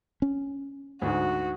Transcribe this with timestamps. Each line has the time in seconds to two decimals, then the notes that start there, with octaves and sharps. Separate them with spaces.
0.22 C#4
1.02 D2 G#2 F#4